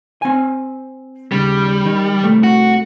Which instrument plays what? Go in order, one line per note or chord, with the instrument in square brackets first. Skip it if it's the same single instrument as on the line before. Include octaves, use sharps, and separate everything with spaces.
[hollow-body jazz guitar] C4 G#5
[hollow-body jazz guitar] D#2 C#3 [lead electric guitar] G3
[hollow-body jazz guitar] D#3
C2 A3
[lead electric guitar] F#4